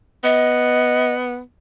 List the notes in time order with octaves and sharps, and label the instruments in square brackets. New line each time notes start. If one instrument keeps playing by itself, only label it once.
[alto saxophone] B3 [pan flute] D#5